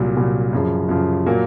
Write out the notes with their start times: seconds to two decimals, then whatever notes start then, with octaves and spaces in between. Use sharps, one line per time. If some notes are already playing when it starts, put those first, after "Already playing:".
Already playing: C2 A#2 F#3
0.16 C2 A#2 F#3
0.53 F#2 C#3 F3
0.89 F#2 C#3 F3
1.26 A#2 F#3 A#3